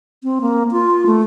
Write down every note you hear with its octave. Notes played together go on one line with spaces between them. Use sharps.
C4
A#3
F4
A3